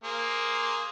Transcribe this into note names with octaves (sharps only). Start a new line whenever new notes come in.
A#3 G#4 C5